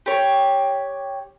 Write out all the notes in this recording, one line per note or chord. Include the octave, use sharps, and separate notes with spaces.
G4 C#5